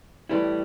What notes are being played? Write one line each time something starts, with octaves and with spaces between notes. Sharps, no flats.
A2 E3 G3 E4